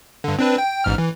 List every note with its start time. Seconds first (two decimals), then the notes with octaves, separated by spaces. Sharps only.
0.24 G2 D3
0.39 C4 D4 B4
0.58 G5
0.84 A1 G#2 F6
0.98 E3